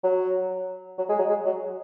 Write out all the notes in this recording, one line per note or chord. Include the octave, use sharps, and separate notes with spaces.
F#3
F#3
G#3
F#3
G#3
F#3